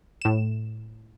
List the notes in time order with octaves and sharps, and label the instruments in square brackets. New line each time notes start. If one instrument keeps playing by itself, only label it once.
[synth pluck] A2 E7